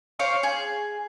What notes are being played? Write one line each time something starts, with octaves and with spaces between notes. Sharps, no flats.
C5 C#5 F5 D6
G#4